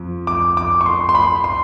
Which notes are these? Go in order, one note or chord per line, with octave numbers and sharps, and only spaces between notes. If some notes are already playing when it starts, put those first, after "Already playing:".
Already playing: F2
D6
D6
C#6
C6
C6
B5
C6